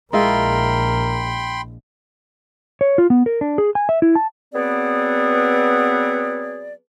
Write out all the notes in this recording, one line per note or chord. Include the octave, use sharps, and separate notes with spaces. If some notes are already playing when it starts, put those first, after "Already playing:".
A#1 G#3 E4 F4 A#4 G5 B5 C6
C#5
F4
B3
A#4
D4
G#4
G#5
E5
E4
A5
F#3 B3 C4 G#4 B4 D5